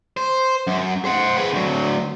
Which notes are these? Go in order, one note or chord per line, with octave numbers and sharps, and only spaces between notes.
C5
F#2
C5 F#5
G#4 B4
D2 F#3